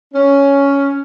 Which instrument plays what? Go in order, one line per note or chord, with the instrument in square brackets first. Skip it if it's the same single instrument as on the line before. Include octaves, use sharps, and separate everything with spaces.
[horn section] C#4